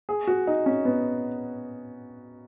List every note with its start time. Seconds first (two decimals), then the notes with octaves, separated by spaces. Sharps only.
0.09 G#4
0.27 F#4
0.47 D#4
0.66 C#4
0.85 B3